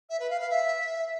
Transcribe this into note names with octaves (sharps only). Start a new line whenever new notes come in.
E5
B4
F5
F5
E5